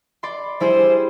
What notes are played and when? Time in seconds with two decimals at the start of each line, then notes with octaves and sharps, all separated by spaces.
0.23 D5 B5 C6
0.60 G3 E4 G#4 C5